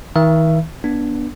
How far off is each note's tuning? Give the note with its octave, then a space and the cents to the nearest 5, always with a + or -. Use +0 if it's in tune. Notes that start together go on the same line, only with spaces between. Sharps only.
D#3 +45 E5 +30
B3 -25 D4 +0